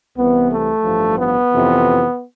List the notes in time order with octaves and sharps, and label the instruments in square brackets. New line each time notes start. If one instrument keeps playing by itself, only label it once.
[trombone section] C2 C3 E3 B3
A3
A1 G2 F3
B3
F2 C3 E3